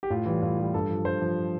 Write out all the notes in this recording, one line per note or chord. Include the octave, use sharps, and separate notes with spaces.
G4
A2 F4
E3 G3
A2 F4
E3 G3
G2 A4
F3
G2 C5
F3